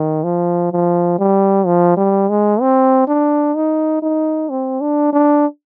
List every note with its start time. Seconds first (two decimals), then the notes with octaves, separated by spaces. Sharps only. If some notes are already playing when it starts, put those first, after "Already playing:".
Already playing: D#3
0.24 F3
0.72 F3
1.19 G3
1.66 F3
1.97 G3
2.30 G#3
2.61 C4
3.08 D4
3.55 D#4
4.03 D#4
4.50 C4
4.81 D4
5.13 D4